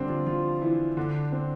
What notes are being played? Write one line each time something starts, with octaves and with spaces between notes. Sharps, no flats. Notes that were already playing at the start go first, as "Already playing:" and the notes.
Already playing: D3 G3 C4 D4 G4
F3 F4
F3 F4
E3 E4
D3 D4
C4